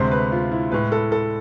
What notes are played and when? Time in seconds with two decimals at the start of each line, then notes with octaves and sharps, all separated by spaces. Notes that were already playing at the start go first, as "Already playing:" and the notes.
Already playing: D2 C3 G#3 C5
0.11 B4
0.32 F4
0.52 E4
0.72 A2 G#3 B4
0.92 A4
1.12 A4